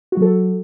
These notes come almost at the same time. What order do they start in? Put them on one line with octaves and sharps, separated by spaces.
F#4 F#3 A4